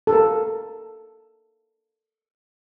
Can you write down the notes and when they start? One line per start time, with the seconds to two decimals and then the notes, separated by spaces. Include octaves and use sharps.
0.07 A4
0.13 A#4